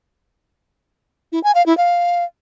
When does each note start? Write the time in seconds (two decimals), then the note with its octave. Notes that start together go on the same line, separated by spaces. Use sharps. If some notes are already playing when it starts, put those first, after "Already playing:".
1.32 E4
1.44 G#5
1.55 F5
1.66 E4
1.77 F5